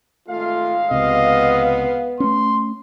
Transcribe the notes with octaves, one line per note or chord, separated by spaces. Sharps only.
G#1 G#3 A3 F4 F5
C#2 C3 B3 D#5
A3 C#4 C6